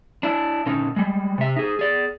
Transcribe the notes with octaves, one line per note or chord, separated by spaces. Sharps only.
D4 E4
A#2 D3 C#4 D#4
G3 G#3
C3 E5
D#4 G#4
G#4 D5